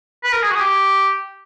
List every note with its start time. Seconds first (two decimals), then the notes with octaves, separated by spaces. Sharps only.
0.24 B4
0.33 A#4
0.42 G#4
0.51 F#4
0.56 G#4
0.61 G4